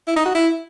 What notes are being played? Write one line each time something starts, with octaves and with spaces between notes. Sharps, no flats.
E4
D#4
F#4
E4